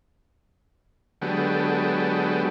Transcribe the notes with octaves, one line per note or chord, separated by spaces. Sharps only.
D3 F#3 G#3 B3 G4 A4